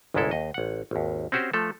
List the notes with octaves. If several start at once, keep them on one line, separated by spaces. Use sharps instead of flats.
G1 C2 G#2 G#3 E4 A4
D#2 D#5
A1 F#5
G#1 D#2
C4 C#4 F#4 G4 C5
F3 A3 A4